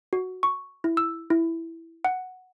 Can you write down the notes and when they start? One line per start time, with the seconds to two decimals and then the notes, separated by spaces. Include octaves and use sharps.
0.13 F#4
0.43 C#6
0.84 E4
0.97 E6
1.30 E4
2.05 F#5